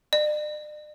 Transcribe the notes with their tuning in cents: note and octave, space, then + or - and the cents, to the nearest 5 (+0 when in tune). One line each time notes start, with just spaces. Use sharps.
D5 +45